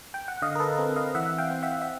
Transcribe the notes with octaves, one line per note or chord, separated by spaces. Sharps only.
G5
F#5
D3 D#5 F5
A#4
A4 B4
C4 A4 B4
D#5 F5
E3 E5 F#5
F5 G5
C4
E5 F#5
E5